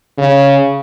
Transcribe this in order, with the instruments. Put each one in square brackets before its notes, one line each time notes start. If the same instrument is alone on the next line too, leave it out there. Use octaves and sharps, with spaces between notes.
[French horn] C#3